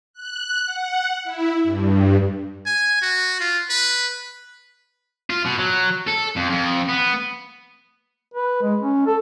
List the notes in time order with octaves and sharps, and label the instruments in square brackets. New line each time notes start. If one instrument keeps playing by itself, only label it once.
[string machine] F#6
F#5
E4
G2
[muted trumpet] G#5
F#4
F4
B4
[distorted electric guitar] F4
B2
F#3
A4
F2
F2
B3
[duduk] B4
G#3
C#4
A4